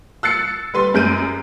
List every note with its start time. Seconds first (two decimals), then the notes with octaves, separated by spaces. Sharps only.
0.23 E6 F#6 A6 C7 C#7
0.74 G3 B4 C6
0.94 F#2 G#3 G6 D7 D#7